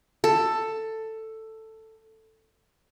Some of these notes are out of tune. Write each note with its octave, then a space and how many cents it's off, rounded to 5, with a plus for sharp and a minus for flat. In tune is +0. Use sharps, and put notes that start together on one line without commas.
A4 +10